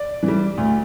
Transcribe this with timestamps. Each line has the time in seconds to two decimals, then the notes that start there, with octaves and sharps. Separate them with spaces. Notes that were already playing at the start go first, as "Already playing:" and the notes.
Already playing: D5
0.23 E3
0.28 G3
0.57 D2